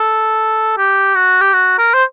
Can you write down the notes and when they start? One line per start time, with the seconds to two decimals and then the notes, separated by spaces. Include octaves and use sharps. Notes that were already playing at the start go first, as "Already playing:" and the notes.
Already playing: A4
0.77 G4
1.15 F#4
1.41 G4
1.53 F#4
1.78 A#4
1.94 C5